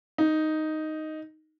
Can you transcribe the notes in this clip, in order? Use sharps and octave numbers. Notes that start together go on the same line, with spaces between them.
D#4